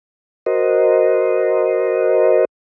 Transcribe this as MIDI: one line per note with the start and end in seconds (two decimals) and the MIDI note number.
0.46 2.45 66
0.46 2.45 70
0.46 2.45 72
0.46 2.45 75